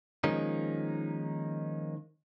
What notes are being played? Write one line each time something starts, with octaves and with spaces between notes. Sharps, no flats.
D#3 F3 G#3 A#3 C#4 D#4